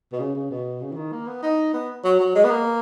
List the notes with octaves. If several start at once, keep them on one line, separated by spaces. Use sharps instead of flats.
B2
C#3
C#3
B2
C#3
E3
D#3
A#3
B3
D#4
B3
F#3
F#3
G#3
B3
A#3